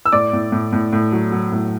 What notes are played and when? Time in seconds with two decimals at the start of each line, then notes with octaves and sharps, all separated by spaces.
0.06 E6
0.12 A2 D5 D6
0.33 A2
0.52 A2
0.73 A2
0.93 A2
1.12 F#3
1.32 F#3
1.52 A2